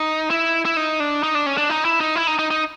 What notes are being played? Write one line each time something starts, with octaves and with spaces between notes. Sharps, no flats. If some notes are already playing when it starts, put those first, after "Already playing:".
Already playing: D#4
E4
E4
D#4
D4
D#4
D4
C#4
D4
D#4
E4
D#4
E4
D#4
D#4
D#4